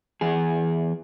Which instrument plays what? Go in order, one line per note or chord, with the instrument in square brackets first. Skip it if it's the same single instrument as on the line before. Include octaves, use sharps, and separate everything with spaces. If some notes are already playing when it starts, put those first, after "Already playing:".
[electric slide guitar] E2 G#4